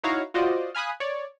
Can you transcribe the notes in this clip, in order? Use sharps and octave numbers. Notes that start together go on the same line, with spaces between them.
D#4 E4 F#4 C#5 F5 A#5
F4 F#4 C5 D5 D#5
F5 G#5 B5 D#6 F#6
C#5 D5